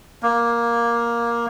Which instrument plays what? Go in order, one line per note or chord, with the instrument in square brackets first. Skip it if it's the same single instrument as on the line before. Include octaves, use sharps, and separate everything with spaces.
[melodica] A#3